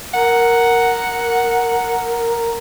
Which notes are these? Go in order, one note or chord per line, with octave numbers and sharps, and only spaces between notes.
A#4 F#5